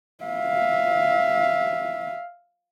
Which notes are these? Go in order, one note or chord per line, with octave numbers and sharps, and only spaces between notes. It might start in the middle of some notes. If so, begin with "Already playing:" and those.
E5 F5